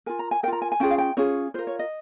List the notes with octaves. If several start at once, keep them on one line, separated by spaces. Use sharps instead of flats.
F4 A#4 G#5
A#5
G#5
F4 A#4 G5 A#5
G#5
G#5
C#4 F4 G#4 G5
F5
G5
C#4 F4 G#4 C#5
F4 A#4 C5
C#5
D#5